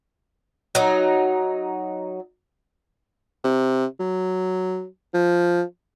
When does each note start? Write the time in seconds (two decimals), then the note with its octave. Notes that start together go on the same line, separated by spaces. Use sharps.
0.75 F#3 D#4
3.44 C3
3.99 F#3
5.14 F3